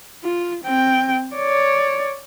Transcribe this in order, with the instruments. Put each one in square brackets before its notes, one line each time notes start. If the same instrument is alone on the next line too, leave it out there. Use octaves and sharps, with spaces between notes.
[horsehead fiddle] F4
C4 G5
C#5 D5